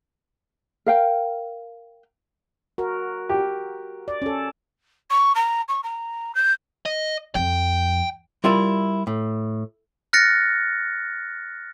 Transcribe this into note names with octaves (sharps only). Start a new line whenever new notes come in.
A#4 F5 G5
F#4 A#4
G4
D5
C#4 A4
C#6
A#5
C#6
A#5
G6
D#5
F2 G5
G3 E4 F4 A#4 D5 E5
A2
F6 F#6 A6 A#6 C#7